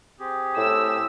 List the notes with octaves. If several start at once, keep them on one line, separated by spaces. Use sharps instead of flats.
C4 G4 G#4
A2 E6